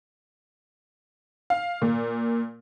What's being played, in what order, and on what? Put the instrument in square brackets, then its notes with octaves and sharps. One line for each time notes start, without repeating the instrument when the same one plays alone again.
[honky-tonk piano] F5
A#2